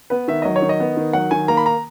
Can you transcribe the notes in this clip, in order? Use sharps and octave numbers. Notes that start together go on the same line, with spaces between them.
B3 B4
D#3 E5
F#3 D#5
C#5
D#3
D#5
B3
D#3
F#3 F#5
D#3 G#5
A#3 A#5
B5
A#5